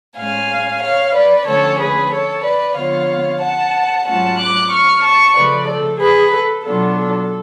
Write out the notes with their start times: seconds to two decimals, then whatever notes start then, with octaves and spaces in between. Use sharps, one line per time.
0.17 A2 G#3 C#4 F5 G#5
0.82 C#5 F5
1.14 B4 D5
1.46 D3 F3 A3 C#4 A4 C#5
1.79 G#4 B4
2.11 A4 C#5
2.44 B4 D5
2.76 D3 F3 B3 F4 C#5 F5
3.41 F#5 A5
4.06 G#2 F#3 A3 C#4 F4 F#5 A5
4.38 D6 F#6
4.70 C#6 F6
5.03 A5 C#6
5.35 C#3 F3 A3 B4 D5
5.67 A4
6.01 G#4 B4
6.33 A4
6.65 B2 F#3 B3 D4 F4 A4
6.98 A4